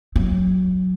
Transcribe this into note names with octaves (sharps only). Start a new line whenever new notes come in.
F#3